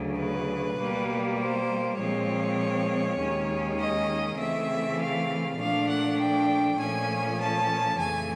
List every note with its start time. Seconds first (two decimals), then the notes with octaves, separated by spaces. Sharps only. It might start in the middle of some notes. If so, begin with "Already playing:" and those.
Already playing: D2 C#3 F#3
0.19 B4
0.78 B2 G3 A#3
1.39 C5
1.98 A#2 F3 G#3 C4 C#5
3.19 D#2 D#3 G#3 C#4
3.79 D#5
4.39 C#3 E3 A3 C4 E5
4.99 F5
5.59 A#2 F3 A3 D4 F5
5.88 F#5
6.18 G5
6.79 A#2 F3 A3 C#4 G#5
7.39 A5
7.98 F2 C#3 E3 A3 G#5